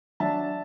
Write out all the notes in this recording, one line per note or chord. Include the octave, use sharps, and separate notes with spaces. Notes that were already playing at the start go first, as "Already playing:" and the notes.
F#3 D4 E5 A5